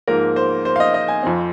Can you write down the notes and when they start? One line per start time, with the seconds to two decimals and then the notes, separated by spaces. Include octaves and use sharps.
0.08 G#2 F3 A#3 A#4
0.36 C5
0.65 C5
0.76 F5
0.80 D#5
0.94 D#5
1.08 G#5
1.23 F2 F3 C4